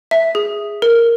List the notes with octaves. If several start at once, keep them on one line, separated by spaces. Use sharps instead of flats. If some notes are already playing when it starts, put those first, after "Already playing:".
E5
G#4
A#4